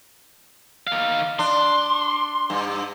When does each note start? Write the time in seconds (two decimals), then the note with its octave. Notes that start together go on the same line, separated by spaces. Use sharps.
0.87 D#3 F5
1.39 D4 C6
2.50 G2